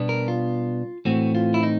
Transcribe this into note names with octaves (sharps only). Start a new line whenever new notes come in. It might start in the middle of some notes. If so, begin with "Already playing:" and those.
Already playing: B2 G3 B3 D4
A#4
F4
A2 E3 A3 C4 F#4
F4
E4
D#4